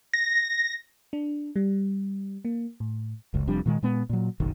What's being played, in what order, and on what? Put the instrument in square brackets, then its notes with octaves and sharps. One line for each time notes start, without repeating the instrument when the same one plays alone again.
[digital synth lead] A#6
[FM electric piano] D4
G3
A#3
A2
[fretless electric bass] F#1 C#2
F1 F2 G3 D4
A#2 D#3 G#3
A#2 G#3 B3
A#2 F#3
F#1 B1 D#3